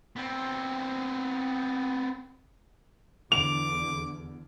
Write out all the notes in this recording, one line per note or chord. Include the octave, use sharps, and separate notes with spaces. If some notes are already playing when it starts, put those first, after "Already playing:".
B3 C4
E2 D3 D6 F7